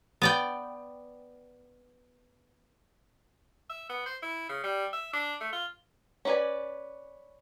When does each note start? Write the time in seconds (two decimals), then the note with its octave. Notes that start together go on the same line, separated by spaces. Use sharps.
0.22 B3 D5 G5
3.70 E5
3.89 B3
4.06 C5
4.23 E4
4.49 C#3
4.63 G3
4.93 E5
5.13 D4
5.41 A3
5.53 F4
6.25 C#4 D4 B4 D5 G#5